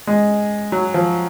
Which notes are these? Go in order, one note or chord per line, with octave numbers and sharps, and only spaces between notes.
G#3
F#3
F3